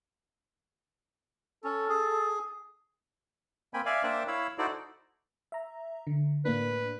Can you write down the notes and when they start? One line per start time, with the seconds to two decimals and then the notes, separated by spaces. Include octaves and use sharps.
1.64 C#4 A4
1.89 G#4
3.74 A#3 C4 G5 G#5 B5
3.86 D5 E5 F5 G#5
4.03 A#3 D4 C5 E5 G5 A5
4.28 E4 C#5 F5 B5 E6
4.58 D#4 E4 F#4 A4 C5 D5
5.52 E5 A#5
6.07 D3
6.45 A2 A#3 D4 B4